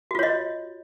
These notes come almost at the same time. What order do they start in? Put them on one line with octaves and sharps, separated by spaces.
F#4 F4 C#5 D#5